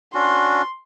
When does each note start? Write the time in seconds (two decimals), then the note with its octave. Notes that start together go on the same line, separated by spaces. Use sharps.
0.14 C#4 D4 F#4 C6